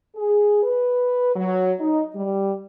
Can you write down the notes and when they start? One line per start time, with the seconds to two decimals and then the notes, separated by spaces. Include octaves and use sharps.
0.16 G#4
0.63 B4
1.36 F#3
1.80 D#4
2.15 G3